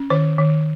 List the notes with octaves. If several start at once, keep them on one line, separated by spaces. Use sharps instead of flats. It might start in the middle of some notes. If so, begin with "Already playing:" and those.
Already playing: C#4
D#3 C5
D#3